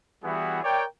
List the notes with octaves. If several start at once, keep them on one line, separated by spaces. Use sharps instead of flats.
E3 G3 B3 E4 F#4 G#4
A#4 C#5 D5 G5